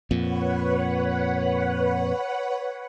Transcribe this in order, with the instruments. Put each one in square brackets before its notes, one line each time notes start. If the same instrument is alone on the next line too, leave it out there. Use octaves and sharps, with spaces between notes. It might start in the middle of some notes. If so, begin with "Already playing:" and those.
[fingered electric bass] F2 A#2 [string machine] B4 C#5 F#5